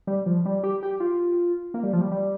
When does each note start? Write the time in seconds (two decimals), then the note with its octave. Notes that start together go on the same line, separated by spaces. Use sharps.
0.07 G3
0.26 F3
0.46 G3
0.63 G4
0.83 G4
1.00 F4
1.74 A#3
1.83 G3
1.93 F3
2.01 G3
2.12 G3